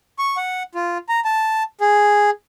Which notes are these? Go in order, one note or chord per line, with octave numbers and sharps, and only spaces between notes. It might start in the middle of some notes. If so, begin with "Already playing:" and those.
C#6
F#5
F4
A#5
A5
G#4